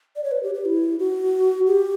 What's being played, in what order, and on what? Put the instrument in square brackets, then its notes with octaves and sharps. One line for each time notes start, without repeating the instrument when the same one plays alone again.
[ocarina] D5
C#5
B4
G4
G4
E4
F#4
G4